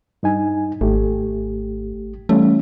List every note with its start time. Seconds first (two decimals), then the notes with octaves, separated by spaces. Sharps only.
0.23 G2 D#4 G#5
0.81 G#1 A3 G4
2.29 E3 G3 A3 C#4